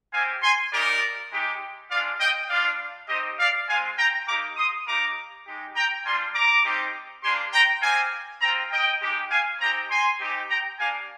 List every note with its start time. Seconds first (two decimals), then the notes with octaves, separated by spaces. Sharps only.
0.12 C4 G4 F5 G#5
0.41 G#5 C6
0.71 A#3 D#4 G4 A#4 D5
1.31 G#3 D#4 G4
1.90 G#3 D4 F4 D5 F5
2.19 D#5 G5
2.49 G3 D4 F4 D5 F5
3.08 C4 D#4 G4 C5 D#5
3.38 D5 F5
3.67 G#3 C4 F4 F5 G#5
3.97 G5 A#5
4.27 A#3 D#4 G4 A#5 D6
4.56 C6 D#6
4.86 A#3 D#4 G4 A#5 D6
5.45 G#3 D#4 G4
5.75 G5 A#5
6.05 G3 D4 F4 G#5 C6
6.34 A#5 D6
6.64 G3 C4 D#4 G4
7.23 A#3 D4 G4 G#5 C6
7.53 G5 A#5
7.82 C4 G4 F5 G#5
8.41 C4 F4 G5 A#5
8.72 D#5 G5
9.01 G#3 D#4 G4
9.30 F5 G#5
9.60 C4 D#4 G4 G5 A#5
9.90 G#5 C6
10.19 C4 D#4 G4
10.49 G5 A#5
10.79 A#3 D4 G4 F5 G#5